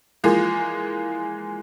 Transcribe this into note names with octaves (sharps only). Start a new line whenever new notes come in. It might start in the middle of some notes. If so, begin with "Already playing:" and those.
E3 F3 G#3 A#3 G#4